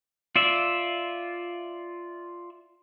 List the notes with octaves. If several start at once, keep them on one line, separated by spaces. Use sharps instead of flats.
F4 D5 E5